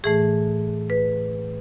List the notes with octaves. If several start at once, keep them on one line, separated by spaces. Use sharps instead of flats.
A2 E3 A3 G#4
B4